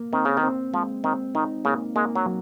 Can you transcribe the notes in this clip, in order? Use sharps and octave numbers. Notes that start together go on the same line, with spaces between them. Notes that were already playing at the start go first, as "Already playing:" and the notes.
Already playing: A#3
D#3 C4
C#3
D#3
C4
F3 G#3
D#3 C4
D#3 D#4
C#3 A#3
G#3 A#3
F#3
F#3